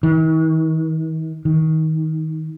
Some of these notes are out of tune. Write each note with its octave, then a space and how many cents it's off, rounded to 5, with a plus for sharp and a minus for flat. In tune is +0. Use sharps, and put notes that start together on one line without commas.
D#3 +45
D#3 +25